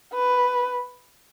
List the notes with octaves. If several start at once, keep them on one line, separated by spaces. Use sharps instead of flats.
B4